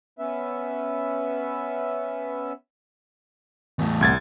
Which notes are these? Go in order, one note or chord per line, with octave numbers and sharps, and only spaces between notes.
B3 C#4 B4 E5
E2 A2
C2 G#6 A6